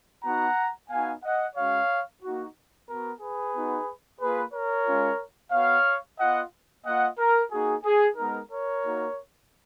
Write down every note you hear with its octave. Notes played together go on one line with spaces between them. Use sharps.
B3 D#4 F#4 F#5 A#5
B3 D#4 F#4 F5 G#5
D#5 F#5
G#3 C#4 F#4 C#5 F5
A#3 D#4 F#4
B3 F#4 A#4
G#4 B4
B3 D#4 F#4
A#3 F4 G#4 B4
A#4 C#5
G#3 C#4 F4
B3 F#4 C#5 F5
B3 F4 D#5 F#5
A#3 F4 D#5 F#5
A#4
A#3 D#4 F#4 G#4
G#4
G#3 B3 D#4 A#4
A#4 C#5
A#3 D#4 F#4